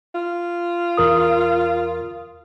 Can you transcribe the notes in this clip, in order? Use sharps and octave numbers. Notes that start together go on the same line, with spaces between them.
F4
E2 A#4 D#6